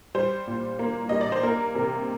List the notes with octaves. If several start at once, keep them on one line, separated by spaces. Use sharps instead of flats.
G3 C5
A#2
A#3
G3 D#5
D5
C5
A#3 A#4
C3 A#4